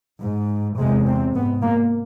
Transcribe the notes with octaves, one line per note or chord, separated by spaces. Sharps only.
G#2
E2 C3 G#3
C4
G#2 B3
A#3